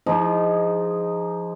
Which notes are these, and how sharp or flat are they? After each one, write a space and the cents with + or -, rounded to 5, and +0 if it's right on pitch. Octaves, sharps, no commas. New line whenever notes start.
F3 -20 D#4 +0 G#4 -10